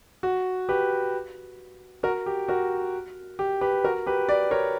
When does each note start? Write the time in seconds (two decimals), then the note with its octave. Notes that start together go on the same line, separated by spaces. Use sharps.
0.23 F#4
0.69 G4 B4
2.03 F#4 A#4
2.26 G4
2.48 F#4 A#4
3.39 G4
3.61 G4 B4
3.84 F#4 A#4
4.06 G4 B4
4.29 B4 D5
4.51 A#4 C#5